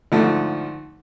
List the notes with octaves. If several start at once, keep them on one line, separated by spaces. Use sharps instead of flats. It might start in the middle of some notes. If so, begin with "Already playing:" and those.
D2 G#2 F3 A3